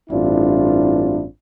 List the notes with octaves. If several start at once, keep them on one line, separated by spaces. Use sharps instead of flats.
A1 G2 C4 D4 E4 F4